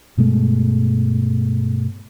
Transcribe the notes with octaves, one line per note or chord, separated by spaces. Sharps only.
G2 B2 G#3 A3